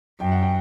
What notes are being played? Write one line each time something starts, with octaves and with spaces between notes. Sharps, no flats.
F#2 G5
F#5
G5